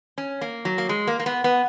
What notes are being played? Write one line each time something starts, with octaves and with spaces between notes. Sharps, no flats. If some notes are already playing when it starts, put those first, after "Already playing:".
C#4
A#3
F#3
A#3
G#3
A#3
A#3
B3
B3